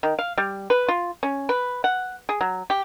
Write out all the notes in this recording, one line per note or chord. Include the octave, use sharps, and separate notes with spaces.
D#3
F5
G3
B4
F4
C#4
B4
F#5
G#4
F#3
G4